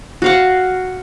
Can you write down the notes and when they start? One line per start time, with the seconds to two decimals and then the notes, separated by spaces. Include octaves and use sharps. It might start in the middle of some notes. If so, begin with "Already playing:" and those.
0.22 F#4 F5 F#5